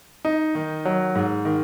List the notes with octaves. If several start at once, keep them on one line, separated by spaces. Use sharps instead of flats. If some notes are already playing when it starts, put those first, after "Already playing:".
D#4
D#3
F#3
G#2
D#3